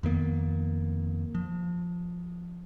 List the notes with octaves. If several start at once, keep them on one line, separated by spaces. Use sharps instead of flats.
F2 D#3 A#3 B3
F3